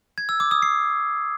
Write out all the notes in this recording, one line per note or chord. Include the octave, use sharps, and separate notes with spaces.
G#6
E6
D6
D#6
C7